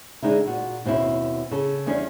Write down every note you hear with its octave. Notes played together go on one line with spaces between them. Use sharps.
D3 G#3 D#4 E4
A#2 F#4
D#2 B2 C4 C#4 E4
C#3 A4
E2 D#3 G3 C#4 D4